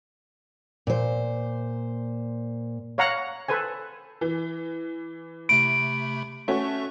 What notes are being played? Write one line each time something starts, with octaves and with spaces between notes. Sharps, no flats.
A#2 C5
C#5 F5 F#5 A#5
A4 B4 C5 G#5
E3
C3 A3 B5 D7
A3 C#4 F#4 E5 C#6